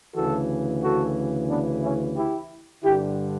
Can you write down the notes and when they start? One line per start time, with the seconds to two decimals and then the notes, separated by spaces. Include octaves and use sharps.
0.15 D2 C#3 E3 F#4 A4
0.83 F#4 A4
1.49 B3 D4
1.83 C#4 E4
2.16 E4 G4
2.83 G2 D3 E4 G4